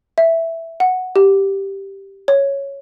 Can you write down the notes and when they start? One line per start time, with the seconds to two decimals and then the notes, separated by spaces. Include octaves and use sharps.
0.18 E5
0.80 F#5
1.16 G4
2.28 C#5